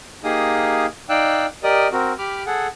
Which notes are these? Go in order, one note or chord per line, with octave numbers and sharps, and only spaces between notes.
A#3 D#4 G4 G#4 F5 D#6
D#4 D5 F5 G5 E6 F#6
G4 A#4 D5 D#5 D#6
C4 F#4 A#4
G4 B5 D6 F6
G#4 A4 F#5